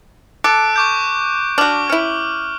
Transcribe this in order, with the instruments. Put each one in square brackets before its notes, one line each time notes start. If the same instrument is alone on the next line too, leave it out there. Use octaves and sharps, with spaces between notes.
[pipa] A4 [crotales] D6 F#6 D7
[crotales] C#6 D6 G6
[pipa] D4 F#4 [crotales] D6 F6 F#7
[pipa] C#4 E4 [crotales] F6